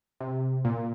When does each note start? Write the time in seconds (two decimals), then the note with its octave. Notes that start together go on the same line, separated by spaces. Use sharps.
0.20 C3
0.65 A#2